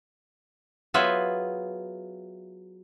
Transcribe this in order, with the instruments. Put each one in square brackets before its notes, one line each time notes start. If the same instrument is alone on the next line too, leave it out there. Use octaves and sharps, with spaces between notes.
[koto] F#3 B3 F4 G#4 B4 E5